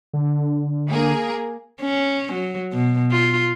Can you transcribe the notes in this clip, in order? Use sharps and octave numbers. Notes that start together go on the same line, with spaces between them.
D3
A#3 G#4 A#4
C#4
F#3
B2
F4